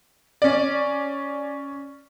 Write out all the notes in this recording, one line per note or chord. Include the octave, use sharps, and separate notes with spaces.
C#4 D5